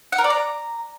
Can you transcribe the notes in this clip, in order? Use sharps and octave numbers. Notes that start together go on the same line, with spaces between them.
F#5
A#4
D5
A#5